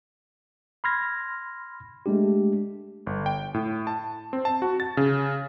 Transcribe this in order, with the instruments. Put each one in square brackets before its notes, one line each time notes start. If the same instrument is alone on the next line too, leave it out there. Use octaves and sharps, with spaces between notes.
[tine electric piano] B5 C6 F6 G#6 A#6
G#3 A3 D4 G4
[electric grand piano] G1
G5
A2
A5
C4
A5
F#4
A6
C#3